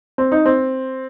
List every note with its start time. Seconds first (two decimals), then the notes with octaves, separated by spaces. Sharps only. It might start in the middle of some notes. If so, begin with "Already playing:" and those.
0.18 C4
0.32 D#4
0.46 C4